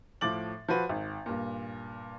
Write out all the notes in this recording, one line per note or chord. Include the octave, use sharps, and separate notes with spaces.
A2 F3 D6 A6 F#7
F3 F#4 B4
G#1
G2 A#2